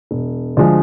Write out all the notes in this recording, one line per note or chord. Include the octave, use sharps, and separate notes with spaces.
E1
D2 D3 F3 G#3